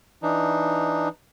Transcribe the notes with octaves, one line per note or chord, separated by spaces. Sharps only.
E3 D4 D#4